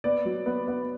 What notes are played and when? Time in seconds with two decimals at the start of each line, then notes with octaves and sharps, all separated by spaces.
0.04 B3 D5
0.26 F#3
0.46 B3
0.67 B3